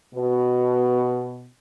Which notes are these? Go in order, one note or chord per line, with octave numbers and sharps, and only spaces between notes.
B2